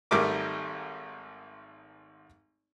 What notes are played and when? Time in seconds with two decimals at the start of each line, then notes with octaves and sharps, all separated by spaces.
0.11 G#1 G#2 G3 A3 A#4 D6